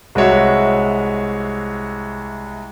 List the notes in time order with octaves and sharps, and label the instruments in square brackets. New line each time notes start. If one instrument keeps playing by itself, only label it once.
[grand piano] C2 G#3 F#4 C#5 E5